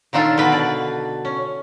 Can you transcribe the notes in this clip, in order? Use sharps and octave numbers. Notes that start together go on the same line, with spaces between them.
A#2 D#3 D4 F4 A4
B2 D3 B4
D5
C#4